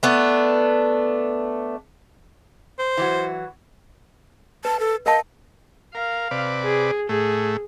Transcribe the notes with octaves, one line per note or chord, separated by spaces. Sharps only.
A3 B3 D4
C5
E3 F#3 F#4
B4 A5
A4
A#4 D#5 F5 A5
A#4 F5
C3 B4 D5
G#4
A2 A3 G#4